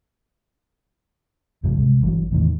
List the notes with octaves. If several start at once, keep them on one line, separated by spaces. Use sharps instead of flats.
F2 G#2 C#3 F#3
C2 G#3
G1 E3 F#3
E2 A2 D3 D#3